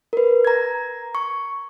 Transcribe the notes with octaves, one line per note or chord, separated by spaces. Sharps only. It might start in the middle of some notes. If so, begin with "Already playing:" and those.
A#4 B4
A#5 G#6
C#6